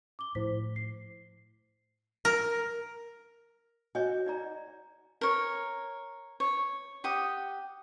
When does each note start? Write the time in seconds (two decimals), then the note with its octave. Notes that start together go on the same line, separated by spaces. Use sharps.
0.19 D6 G7
0.35 A2 F3 E4 C5 B6
0.76 C7
2.25 A#4
3.95 F#4 C#5 D#5 G#5
4.26 D#4 D5 A#5
5.21 A#4 C#5
6.40 C#5
7.04 G4 F#5 D#6